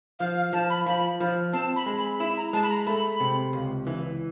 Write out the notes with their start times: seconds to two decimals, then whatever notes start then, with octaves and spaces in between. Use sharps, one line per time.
0.19 F3 F5
0.36 F5
0.53 F3 A5
0.70 B5
0.86 F3 B5
1.20 F3
1.53 C4 A5
1.76 B5
1.86 G#3
1.98 B5
2.20 E4 B5
2.37 A#5
2.53 G#3 A5
2.63 B5
2.70 A#5
2.86 A3 B5
3.20 C3
3.53 C#2
3.87 E3